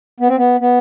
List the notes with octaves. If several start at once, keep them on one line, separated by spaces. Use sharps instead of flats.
B3
C4
B3
B3